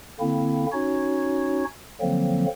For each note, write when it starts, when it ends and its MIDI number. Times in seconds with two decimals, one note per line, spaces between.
0.20 0.66 50
0.20 0.66 58
0.20 0.66 60
0.20 0.66 64
0.72 1.64 61
0.72 1.64 63
0.72 1.64 66
0.72 1.64 73
2.01 2.46 50
2.01 2.46 53
2.01 2.46 54
2.01 2.46 58
2.01 2.46 60